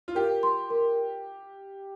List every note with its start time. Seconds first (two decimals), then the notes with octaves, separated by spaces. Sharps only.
0.08 F4
0.15 G4 A#4
0.43 C6
0.70 A#4